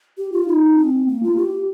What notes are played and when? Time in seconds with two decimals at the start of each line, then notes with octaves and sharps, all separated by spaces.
0.18 G4
0.32 F4
0.48 D#4
0.78 C4
1.08 A#3
1.23 F4
1.37 G4